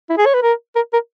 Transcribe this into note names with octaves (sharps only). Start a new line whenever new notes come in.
E4
G#4
C#5
B4
A#4
A#4
A#4